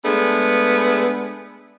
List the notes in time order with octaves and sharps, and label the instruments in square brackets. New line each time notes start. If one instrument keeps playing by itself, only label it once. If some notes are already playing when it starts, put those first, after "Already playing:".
[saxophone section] G#3 A3 B3 D4 G#4